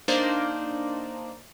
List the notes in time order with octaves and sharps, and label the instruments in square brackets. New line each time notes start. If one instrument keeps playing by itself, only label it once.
[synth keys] A#3 D4 D#4 C5 D5